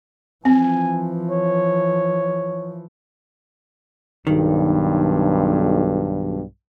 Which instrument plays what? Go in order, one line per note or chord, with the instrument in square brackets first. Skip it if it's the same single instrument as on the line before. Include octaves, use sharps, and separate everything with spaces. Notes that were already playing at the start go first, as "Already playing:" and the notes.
[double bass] E3 F3 [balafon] C4 [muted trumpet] G#5
[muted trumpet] C#5
[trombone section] B1 G2 [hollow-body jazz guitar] D#3